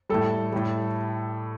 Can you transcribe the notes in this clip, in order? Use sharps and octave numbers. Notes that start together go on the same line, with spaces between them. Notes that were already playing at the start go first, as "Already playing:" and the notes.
A2 G3 A4
A2 G3